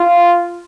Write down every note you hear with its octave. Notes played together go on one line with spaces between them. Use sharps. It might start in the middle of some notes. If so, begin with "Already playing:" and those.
Already playing: F4